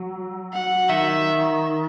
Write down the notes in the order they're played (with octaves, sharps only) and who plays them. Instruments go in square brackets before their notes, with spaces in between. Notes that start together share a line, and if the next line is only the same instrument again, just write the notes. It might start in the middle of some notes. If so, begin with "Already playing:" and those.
Already playing: [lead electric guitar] F#3
[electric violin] F#5
[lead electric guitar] D#3 [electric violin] E5